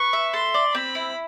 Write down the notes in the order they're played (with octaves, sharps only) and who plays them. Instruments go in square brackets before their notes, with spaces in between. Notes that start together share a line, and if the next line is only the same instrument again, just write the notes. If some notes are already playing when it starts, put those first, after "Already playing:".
Already playing: [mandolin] B4 [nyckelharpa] C#6
[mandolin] E5
[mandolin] A4 [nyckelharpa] C6
[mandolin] D5
[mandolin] C4 [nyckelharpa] B5
[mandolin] E4